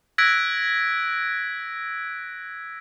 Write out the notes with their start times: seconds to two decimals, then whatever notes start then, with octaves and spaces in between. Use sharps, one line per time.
0.18 E6 F#6 G#6 A#6 B6 D7